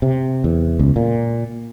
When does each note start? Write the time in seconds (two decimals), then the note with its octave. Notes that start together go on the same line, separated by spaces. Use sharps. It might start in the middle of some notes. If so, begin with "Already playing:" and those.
0.02 C3
0.44 E2
0.79 C#2
0.96 A#2